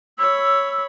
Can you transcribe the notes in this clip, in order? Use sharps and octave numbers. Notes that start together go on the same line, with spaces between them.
C#5 B5 E6